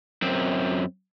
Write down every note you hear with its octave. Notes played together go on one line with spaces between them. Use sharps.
F#2 C4